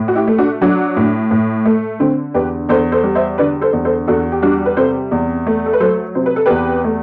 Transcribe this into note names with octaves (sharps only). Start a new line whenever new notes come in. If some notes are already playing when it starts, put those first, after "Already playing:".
Already playing: A2
F#4
E4 G4
A3
D4 F#4
F#3 D4 F#4
A2
A2
A3
D3 C4
E2 G4 B4
E2 A4 C5
A4 C5
G3
C5 E5
D3 B4 D5
A4 C5
E2
A4 C5
E2 F#4 A4
G4
G3 D4 F#4
B4
C3 A4 C5
E2
A3
A4
B4
F#3 A4 C5
C3 C5
B4
A4
E2 G4 B4
A3